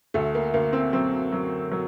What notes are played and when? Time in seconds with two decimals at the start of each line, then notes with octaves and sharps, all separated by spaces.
0.14 D2 A3
0.35 A#3
0.54 D2 A#3
0.73 C4
0.93 F#3 C4
1.32 F#3
1.72 F#3